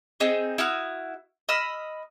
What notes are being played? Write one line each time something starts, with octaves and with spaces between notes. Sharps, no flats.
C4 D#4 G#4
E4 F#4 D#6 F6
D#5 B5 E6 F6